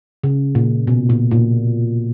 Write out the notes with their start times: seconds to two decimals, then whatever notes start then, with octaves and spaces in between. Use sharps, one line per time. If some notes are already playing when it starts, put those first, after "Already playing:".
0.24 C#3
0.55 A#2
0.87 B2
1.10 A#2
1.31 A#2